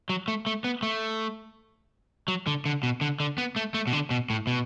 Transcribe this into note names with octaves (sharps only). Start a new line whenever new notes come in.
F#3
A3
A3
B3
A3
F#3
D3
D3
B2
D3
D3
B3
A3
A3
B2
D3
B2
A2
B2